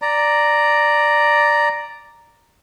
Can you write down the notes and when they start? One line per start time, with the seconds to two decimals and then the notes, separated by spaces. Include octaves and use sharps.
0.02 D5 A#5